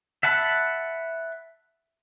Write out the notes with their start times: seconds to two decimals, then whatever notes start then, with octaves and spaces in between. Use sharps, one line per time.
0.23 E5 F#5 A5 B5